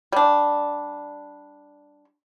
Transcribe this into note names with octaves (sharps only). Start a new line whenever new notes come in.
G3 D4